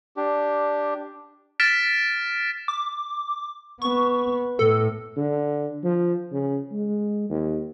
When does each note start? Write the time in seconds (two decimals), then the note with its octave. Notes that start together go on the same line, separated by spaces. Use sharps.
0.17 D4 G4
1.60 F6 A6 B6 D7 E7
2.68 D6
3.82 B3 C#6
4.59 A2 A4
5.16 D3
5.84 F3
6.32 C#3
6.72 G#3
7.30 D#2